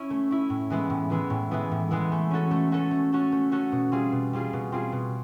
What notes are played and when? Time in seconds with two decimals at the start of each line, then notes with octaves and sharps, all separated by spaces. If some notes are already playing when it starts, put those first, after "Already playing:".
Already playing: C#4 E4
0.10 A3
0.31 C#4 E4
0.50 A2
0.70 E3 G#3 B3 E4
0.90 A2
1.10 E3 G#3 B3 E4
1.30 A2
1.51 E3 G#3 B3 E4
1.71 A2
1.91 E3 G#3 B3 E4
2.12 A3
2.31 C#4 F#4 A4
2.51 A3
2.72 C#4 F#4 A4
2.91 A3
3.12 C#4 F#4 A4
3.32 A3
3.51 C#4 F#4 A4
3.72 B2
3.92 G3 C4 F4 G#4
4.12 B2
4.33 G3 C4 F4 G#4
4.53 B2
4.72 G3 C4 F4 G#4
4.92 B2